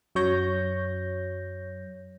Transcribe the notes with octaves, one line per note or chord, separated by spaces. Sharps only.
F#2 F#3 C#5 G6 A#6